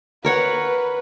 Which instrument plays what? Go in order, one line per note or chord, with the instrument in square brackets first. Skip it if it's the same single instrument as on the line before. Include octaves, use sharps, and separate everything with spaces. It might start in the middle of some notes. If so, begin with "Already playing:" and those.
[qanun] A#4 C#5 F#5 [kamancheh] B4